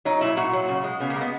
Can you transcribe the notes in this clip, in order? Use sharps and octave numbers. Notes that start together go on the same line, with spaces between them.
F#3 D#4
A#2 E4
A#2 F#4
F#3
C#3
G#3
C#3 B3
A#3
G#3
B3